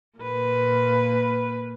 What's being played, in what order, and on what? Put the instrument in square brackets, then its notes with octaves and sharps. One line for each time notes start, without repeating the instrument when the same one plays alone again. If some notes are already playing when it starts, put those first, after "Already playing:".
[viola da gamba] A#2 A#3 B4